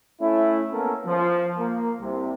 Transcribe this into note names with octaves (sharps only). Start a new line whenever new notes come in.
A3 C#4 E4
A#3 B3 C#4 A4 A#4
F3
A#3
C2 C3